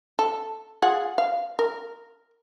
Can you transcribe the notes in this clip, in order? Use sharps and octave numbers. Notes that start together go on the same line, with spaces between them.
A4
F4 G#4 F#5
F5
A#4